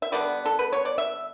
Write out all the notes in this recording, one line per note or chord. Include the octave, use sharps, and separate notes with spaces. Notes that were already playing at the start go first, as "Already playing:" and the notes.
E5
D3 G3 B3 D5
A4
B4
C#5
D5
E5